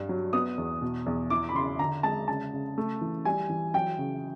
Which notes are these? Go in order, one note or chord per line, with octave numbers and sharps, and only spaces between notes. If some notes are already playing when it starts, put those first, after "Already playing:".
Already playing: G2 G3
F#3
B3 D#6
E2
B2
E2
E4 D6
B5
C#3 C6
D3 A#5
G#3 A5
C#3 A5
C#3
A3
E3
G3 G#5
E3
F#3 G5
C#3